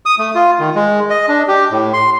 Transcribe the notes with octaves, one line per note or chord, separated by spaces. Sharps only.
D#6
A3
F4
D#3
G#3
D#5
D4
G4
A2
C6